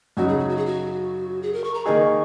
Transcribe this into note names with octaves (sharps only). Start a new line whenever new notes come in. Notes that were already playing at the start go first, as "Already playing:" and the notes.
F#2 C#3 F#3 D#4 F#4
G#4
F#4
F#4
G#4
F#4
G#4
A#4
C#6
A#5
D#3 A#3 D#4 G#4 C#6